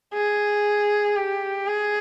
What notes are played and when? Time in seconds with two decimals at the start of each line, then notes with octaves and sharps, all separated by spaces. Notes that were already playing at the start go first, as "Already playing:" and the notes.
0.14 G#4
1.16 G4
1.67 G#4